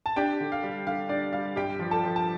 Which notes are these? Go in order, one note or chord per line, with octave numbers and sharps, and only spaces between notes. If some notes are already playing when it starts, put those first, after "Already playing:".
A5
D4 G4 G5
D3
F5
G3
D3 F5
D4 D5
G3 F5
G2 G4 G5
F3
A4 A5
F3
A5